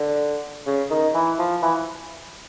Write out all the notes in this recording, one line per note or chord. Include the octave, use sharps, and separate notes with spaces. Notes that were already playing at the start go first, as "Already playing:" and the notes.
Already playing: D3
C#3
D#3
E3
F3
E3